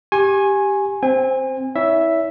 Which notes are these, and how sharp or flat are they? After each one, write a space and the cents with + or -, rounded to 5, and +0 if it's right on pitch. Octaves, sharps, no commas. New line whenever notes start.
G4 +0 G#5 +0 C#6 -45
C4 +0 G#5 -30
E4 -25 C#5 +30 E5 +0